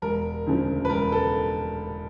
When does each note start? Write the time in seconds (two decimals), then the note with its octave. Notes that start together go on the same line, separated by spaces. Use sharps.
0.02 E1 A#4
0.47 D2 C#3 F3
0.85 B4
0.89 E1 A#4
1.12 A4